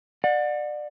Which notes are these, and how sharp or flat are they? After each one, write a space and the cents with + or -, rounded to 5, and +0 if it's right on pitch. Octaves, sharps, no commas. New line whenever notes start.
D5 +25 F#5 -30